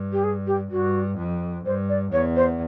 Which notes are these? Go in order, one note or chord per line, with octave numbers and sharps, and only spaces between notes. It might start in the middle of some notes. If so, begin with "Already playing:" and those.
Already playing: G2
G4
G#4
G4
G2 F#4
F2
G2 C5
D5
E2 C#5
C5